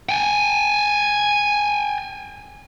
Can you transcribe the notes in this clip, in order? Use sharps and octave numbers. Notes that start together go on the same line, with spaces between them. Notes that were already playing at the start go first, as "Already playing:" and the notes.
G5 G#5